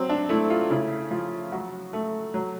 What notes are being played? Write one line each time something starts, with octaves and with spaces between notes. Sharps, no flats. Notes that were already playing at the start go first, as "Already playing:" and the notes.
Already playing: F#3 C4
D4
A3 E4
F4
C#3 E4
F3 F4
F#3 F#4
A3
F#3